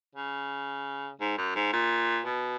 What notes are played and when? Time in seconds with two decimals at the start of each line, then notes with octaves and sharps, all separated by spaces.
0.15 C#3
1.21 G#2
1.38 F#2
1.56 G#2
1.73 A#2
2.26 B2